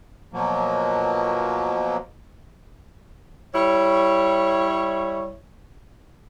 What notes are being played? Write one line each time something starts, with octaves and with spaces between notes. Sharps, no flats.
B2 F3 F#3 A#3
G3 E4 C#5